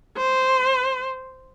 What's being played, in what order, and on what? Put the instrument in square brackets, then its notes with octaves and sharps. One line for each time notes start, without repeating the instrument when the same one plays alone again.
[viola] C5